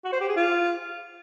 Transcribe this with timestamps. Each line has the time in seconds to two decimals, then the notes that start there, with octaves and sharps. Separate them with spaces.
0.05 F#4
0.13 C5
0.21 G4
0.29 G#4
0.37 F4